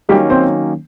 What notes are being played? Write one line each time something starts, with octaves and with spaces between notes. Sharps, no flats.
D#3 F#3 G3 A#3 C#4 G4
C4 C5